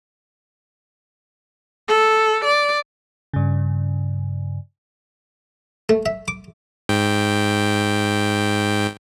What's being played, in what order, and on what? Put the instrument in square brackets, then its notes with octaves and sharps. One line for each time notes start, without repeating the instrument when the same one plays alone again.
[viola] A4
D5
[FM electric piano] G2 C#3
[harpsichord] A3
E5
D6
[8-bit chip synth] G#2 G5